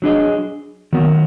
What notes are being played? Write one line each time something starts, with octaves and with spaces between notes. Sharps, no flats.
F#3 D4 G#4 D#5
D#3 F#3 B3